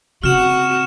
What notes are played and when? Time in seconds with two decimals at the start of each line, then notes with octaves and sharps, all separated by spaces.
0.24 C#3 C4 F#4 F6 E7